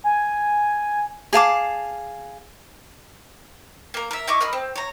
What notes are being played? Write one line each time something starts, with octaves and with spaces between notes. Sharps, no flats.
G#5
G#4 F5 A5 D6
A#3 A#4
A#4 E5
E4 D#5 C#6 D6
A#4 D#5 B5 F6
C4
C#5 A#5